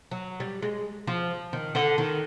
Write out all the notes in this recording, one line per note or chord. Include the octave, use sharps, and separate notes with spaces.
F#3
G3
G#3
F3
D#3
D3
D#3